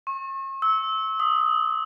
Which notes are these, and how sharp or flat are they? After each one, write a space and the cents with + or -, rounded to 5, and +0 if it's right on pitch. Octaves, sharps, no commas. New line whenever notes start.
C#6 -40
E6 -25
D#6 -5